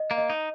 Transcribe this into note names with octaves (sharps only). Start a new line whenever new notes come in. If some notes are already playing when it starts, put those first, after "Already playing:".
Already playing: D#5
A#3
D#5
D#4